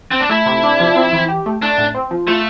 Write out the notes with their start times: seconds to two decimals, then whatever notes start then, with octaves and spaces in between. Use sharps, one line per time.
0.11 C4
0.20 D4
0.30 A3 E4
0.46 C3
0.63 D4
0.80 F3
0.96 C4
1.13 E3
1.28 G4
1.46 A3
1.62 A3 D4
1.78 A2
1.94 C4
2.11 F3
2.27 A3 F4